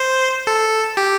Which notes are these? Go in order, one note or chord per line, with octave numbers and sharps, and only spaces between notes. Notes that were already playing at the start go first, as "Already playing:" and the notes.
Already playing: C5
A4
G4